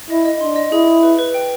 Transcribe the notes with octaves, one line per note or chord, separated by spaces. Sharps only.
E4 D#5
D#5
D4 C6
D#5
E4 G#4
G#4
B4
B4
G5